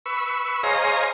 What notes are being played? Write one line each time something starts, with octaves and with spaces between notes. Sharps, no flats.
B4 C#6 E6
G#4 C5 C#5 D#5 F5 A#5